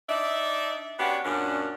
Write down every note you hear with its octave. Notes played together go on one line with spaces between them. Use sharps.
D4 D#4 D5 E5
B3 C#4 D4 F#4 G4
F#2 A#2 C#4 D4